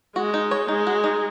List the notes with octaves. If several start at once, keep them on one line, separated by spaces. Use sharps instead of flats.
G#3 F#4
D#4
C#5
G#3 D#4
F#4
D#4